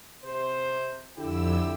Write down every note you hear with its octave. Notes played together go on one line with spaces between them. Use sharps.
C3 C5
F2 D3 E4 G4 E6